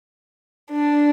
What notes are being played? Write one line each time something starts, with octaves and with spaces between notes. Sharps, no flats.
D4